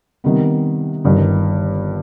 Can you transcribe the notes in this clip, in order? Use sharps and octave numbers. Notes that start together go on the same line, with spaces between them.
C3 D#3 G3 B3
G1 G2 D#3